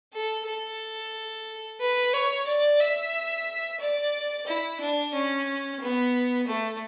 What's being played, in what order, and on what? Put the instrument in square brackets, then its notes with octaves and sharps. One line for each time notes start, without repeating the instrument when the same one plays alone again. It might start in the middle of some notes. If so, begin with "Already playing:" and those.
[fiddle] A4
A4
B4
C#5
D5
E5
D5
E4
D4
C#4
B3
A3